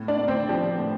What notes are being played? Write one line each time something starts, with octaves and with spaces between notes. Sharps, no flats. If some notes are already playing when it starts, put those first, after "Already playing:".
Already playing: A2
D4 D5
A2
C4 C5
F3 G4
A2